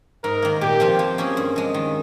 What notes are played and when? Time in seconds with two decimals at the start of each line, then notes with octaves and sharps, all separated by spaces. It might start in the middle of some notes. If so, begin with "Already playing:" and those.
0.24 G#2 A#4
0.42 D#3 A#3
0.61 A#2 G4
0.80 F3 C4 F4
0.99 F3
1.18 A#3 C#4 G#4
1.37 G2
1.56 F3 G#3
1.74 D#3